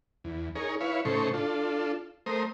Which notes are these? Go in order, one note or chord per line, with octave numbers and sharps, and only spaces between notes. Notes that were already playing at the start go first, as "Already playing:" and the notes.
E2
D#4 G#4 A#4 C#5
E4 B4 C#5 F5
A2 C#3 D#4 A4 C5 C#6
D4 F4 A4
A3 A#4 C5 D#6